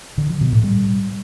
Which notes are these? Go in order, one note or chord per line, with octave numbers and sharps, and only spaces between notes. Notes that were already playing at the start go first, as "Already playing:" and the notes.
D3
F3
B2
A2
G3